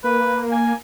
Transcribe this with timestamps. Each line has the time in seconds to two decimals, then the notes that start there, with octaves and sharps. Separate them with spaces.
0.04 A#3 B4
0.52 G#5